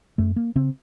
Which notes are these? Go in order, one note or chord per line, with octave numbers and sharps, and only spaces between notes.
F#2 A3
A#3
C#3 C4